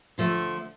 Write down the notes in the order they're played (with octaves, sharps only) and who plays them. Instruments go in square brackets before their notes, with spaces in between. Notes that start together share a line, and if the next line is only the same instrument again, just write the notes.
[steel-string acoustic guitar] D3 F3 A3